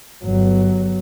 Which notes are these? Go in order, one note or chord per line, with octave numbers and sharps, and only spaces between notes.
G1 F#3